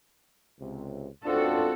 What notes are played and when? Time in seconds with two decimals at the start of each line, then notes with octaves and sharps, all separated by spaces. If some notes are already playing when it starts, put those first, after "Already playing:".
0.60 C#2 C3
1.25 C#2 C4 D4 F4 F#4 A4